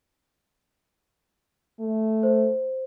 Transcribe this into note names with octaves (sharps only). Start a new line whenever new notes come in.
A3
C5